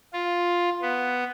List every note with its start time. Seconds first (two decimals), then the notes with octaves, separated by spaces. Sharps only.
0.13 F4
0.82 B3